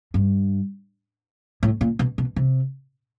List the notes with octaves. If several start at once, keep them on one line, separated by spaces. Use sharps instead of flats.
G2
A2
A#2
B2
B2
C3